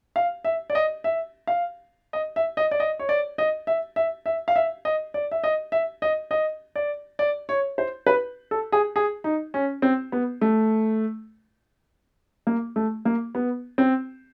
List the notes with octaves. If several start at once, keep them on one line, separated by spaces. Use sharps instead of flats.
F5
E5
D5
D#5
E5
F5
D#5
E5
D#5
D5
D#5
C#5
D5
D#5
E5
E5
E5
F5
E5
D#5
D5
E5
D#5
E5
D#5
D#5
D5
D5
C#5
C5
B4
A4
G#4
G#4
D#4
C#4
C4
B3
A3
A#3
A3
A#3
B3
C4